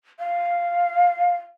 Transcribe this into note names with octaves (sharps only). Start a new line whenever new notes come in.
F5